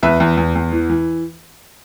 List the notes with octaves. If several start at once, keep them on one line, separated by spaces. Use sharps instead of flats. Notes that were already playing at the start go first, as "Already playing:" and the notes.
E2 B4 E5
E2
E2
E2
E3
E3